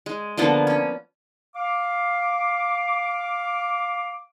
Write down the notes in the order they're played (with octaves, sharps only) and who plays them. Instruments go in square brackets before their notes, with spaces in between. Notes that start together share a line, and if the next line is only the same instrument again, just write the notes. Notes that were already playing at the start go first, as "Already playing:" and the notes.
[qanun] G#3
D3 F3 A#3 B3
C#4
[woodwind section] F5 D6